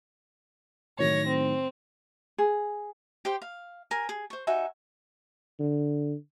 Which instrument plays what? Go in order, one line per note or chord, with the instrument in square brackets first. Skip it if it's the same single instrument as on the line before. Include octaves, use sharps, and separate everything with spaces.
[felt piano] A2 D#3 F#3 [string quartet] C#5 A#6
[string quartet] C4
[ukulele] G#4
[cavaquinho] G4 C5 G5
F5
A#4 G#5
G#4
C5 C#6
D#4 F#4 E5 G#5
[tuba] D3